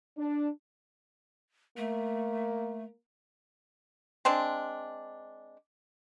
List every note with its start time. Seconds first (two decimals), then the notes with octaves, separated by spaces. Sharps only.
0.18 D4
1.77 A3 A#3
4.25 G#3 C4 D4